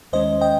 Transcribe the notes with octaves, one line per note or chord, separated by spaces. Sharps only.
D#2 D#3 G#3 C#4 C5 D#5
D#5 G5